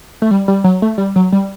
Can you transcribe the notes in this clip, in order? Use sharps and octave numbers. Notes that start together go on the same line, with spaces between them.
A3
G3
G3
F#3
A3
G3
F#3
G3